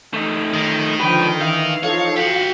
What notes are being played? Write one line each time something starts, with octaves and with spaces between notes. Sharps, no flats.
A3 D#4
D#3
C#2 D3 F3 B4 G5
E3 F5
F3 D#4 A4 C#5
F#4 G4 F#5